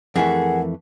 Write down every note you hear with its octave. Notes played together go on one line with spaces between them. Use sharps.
F2 E3 A3 G#4 A#4 F#5